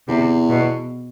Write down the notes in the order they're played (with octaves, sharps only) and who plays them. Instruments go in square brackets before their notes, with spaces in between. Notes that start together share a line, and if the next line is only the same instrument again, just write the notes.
[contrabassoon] E2 [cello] C3
[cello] B2